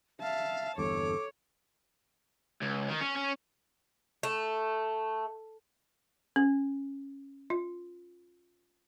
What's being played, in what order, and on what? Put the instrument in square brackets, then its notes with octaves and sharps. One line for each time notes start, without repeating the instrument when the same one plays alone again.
[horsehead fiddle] E5 A5 [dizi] F5
[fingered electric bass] G1 E2 G2 [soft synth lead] A4 [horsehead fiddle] C#5 [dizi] D6
[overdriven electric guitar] C#2
D#3
C#4
C#4
[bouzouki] A3
[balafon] C#4
F4